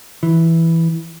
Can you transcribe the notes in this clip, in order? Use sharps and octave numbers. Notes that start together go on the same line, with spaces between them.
E3